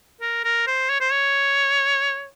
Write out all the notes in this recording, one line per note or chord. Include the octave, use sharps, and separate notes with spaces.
A#4
A#4
C5
C#5
C5
C#5